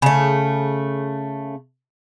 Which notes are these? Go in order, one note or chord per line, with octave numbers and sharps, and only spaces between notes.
C#3 A3